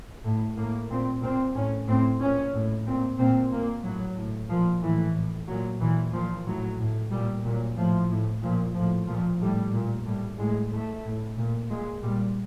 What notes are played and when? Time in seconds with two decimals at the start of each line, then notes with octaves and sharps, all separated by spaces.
0.25 A2
0.57 A2 A#3
0.90 A#2 C4
1.23 A#2 C4
1.55 A2 C#4
1.87 A2 C4
2.21 A#2 C#4
2.54 A2
2.86 A#2 C4
3.19 A#2 C4
3.51 A#2 A#3
3.84 A2 F#3
4.16 A2
4.49 A#2 F3
4.82 A2 E3
5.15 A2
5.47 A#2 F#3
5.80 A#2 E3
6.13 A#2 F3
6.46 A2 F#3
6.79 A2
7.11 A#2 G3
7.44 A#2 F#3
7.77 A2 F3
8.10 A2
8.42 A#2 F3
8.74 A2 F3
9.07 A#2 F3
9.40 A2 G3
9.73 A#2
10.05 A2 G3
10.38 A2 G#3
10.71 A2 A3
11.04 A2
11.37 A#2
11.69 A#2 G#3
12.02 A#2 G3